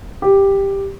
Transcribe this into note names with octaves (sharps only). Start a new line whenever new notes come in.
G4